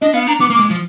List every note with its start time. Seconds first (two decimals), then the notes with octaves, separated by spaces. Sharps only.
0.02 D4 D#5
0.14 B3 F5
0.27 D4 A#5
0.40 B3 D6
0.50 A#3
0.54 D6
0.60 G#3
0.70 F3